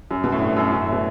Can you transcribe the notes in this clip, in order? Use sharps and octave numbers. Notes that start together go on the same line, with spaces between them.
F#2
B2
A2
G2
F#2
F#2
A2
B2